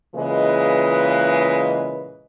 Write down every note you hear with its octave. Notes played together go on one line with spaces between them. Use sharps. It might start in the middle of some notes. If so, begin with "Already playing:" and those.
A#2 C#3 E3 G#3 B4 D#5